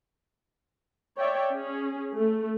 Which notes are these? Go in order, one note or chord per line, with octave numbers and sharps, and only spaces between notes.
C#5 D5 E5 G5
C#4 G#4
A3